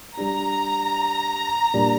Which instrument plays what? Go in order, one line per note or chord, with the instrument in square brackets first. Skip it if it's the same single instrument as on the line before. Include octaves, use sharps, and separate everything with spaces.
[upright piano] G3 D4 G4 [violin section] A#5
[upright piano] A#2 G3 D4 A#4